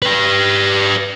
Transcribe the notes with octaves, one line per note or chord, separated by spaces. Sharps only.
G4 B4